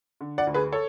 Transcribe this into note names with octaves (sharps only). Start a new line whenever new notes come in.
D3
D5 F#5
D2
G#4 B4
A4 C#5